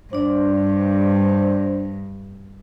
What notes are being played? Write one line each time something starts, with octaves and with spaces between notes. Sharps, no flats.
G2 D4 C5 D5